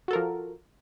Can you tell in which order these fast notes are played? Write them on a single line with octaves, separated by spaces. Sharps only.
F#4 A4 A#4 F3